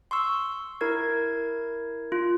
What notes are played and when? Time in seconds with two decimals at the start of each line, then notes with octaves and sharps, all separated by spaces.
0.11 C6 C#6 E6
0.81 E4 A#4 G#6
2.12 F4